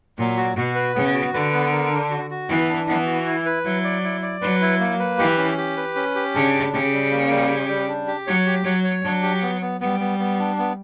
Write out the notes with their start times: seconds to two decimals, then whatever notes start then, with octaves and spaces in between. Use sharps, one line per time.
0.18 A#2 F#3
0.37 F#4
0.56 B2 F#4
0.75 B4
0.95 C#3 B3
1.14 F#4
1.34 D3 B4
1.53 B3
1.72 A#4
1.91 D4
2.10 F#4
2.30 F#4
2.49 E3 B3
2.69 D4
2.88 E3 B3
3.06 F#4
3.26 E4
3.46 B4
3.65 F#3 E4
3.84 D5
4.04 E4
4.23 D5
4.42 F#3 B4
4.61 E4
4.80 A#3
5.00 B4
5.18 E3 G4
5.38 C#4
5.58 G4
5.77 B4
5.96 C#4
6.15 G4
6.34 C#3 D4
6.54 G4
6.73 C#3 G4
6.93 G3
7.12 A#3
7.30 G3
7.49 G4
7.68 G3
7.89 D4
8.07 G4
8.27 F#3 C#5
8.46 G4
8.65 F#3 C#5
8.84 C#5
9.04 F#3 D4
9.23 G4
9.42 B3
9.62 B3
9.80 G3 B3
10.00 B3
10.19 B3
10.39 D4
10.58 B3